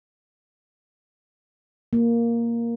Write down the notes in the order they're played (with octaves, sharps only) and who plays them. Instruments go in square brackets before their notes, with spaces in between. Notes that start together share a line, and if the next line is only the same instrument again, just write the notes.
[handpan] A#3